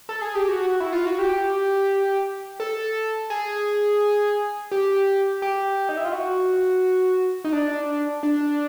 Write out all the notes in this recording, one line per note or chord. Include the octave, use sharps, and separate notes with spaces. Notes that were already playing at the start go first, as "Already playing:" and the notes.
A4
G#4
G4
F#4
E4
F4
F#4
G4
A4
G#4
G4
G4
D#4
E4
F4
F#4
D#4
D4
D4